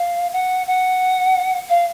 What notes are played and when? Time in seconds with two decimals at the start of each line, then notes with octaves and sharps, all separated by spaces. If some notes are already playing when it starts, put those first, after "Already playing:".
Already playing: F5
0.32 F#5
0.67 F#5
1.69 F5